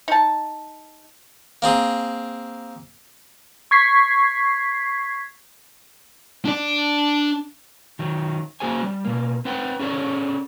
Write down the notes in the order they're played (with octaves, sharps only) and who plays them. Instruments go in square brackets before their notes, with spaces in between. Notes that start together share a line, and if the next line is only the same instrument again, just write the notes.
[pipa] D#4 A5
[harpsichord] A#3 C4 G#4
[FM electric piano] C#6 G#6 B6 C7
[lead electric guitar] D4 D5
[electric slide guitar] D#3 F#3
A#3 F#4 G#4 C5 G#5
G3
B2 A#3
C4 B4 F#5 G5
C#4 G#4 A4 C#5 D5